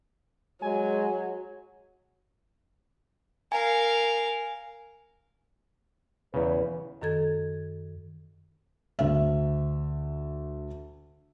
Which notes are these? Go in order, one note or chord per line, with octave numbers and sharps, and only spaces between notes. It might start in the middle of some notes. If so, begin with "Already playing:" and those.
F#3 G#3 G#5
A#4 F5 G#5
E2 C#3 B4
F#2 D#3 A4 G#6
D2 E5